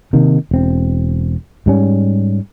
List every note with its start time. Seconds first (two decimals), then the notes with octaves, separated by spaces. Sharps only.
0.13 C3 D#3 A#3
0.51 E1 C4
1.66 G#2 G3 C#4